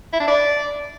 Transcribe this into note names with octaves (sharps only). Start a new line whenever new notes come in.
E4
D4
D5